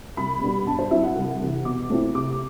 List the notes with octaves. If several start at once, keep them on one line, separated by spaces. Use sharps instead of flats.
C2 B5
B2 G3 B3 D4
G2 A5
C5
F#3 C4 E4 E5
F#5
C2 F#5
C3 E3
B2 D6
A3 C4 E4
C3 D6